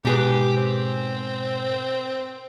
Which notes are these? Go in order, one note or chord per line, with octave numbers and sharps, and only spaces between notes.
G#2 B2 G4 G#4 B4
C4